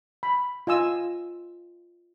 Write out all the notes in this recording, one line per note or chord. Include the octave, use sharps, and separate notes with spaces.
B5
F4 D#5 G#5 E6